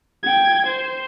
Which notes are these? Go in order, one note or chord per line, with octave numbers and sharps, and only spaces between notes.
G5 G#6
C5